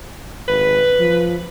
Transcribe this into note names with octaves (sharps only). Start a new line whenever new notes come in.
G#1 B4
F3